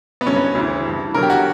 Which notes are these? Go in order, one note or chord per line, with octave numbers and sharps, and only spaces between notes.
B3
G2 D3 F#3 C#4
B3
D2 C#3 E3
G2 E3
E2 D3 F#3 A#4
G4
F#4